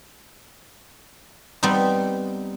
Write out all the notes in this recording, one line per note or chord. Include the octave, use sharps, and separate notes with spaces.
G3 B3 C4 D#4